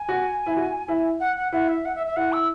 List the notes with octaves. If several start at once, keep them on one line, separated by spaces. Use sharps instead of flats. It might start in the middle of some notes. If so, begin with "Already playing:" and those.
Already playing: G#5
F#4
E4
F#4
E4
F#5
F#5
E4 F#5
E5
F#5
E5
E5
E4 F#5
E6